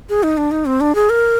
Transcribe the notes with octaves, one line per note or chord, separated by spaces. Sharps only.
G#4
D#4
D4
D#4
C4
D4
G#4
A#4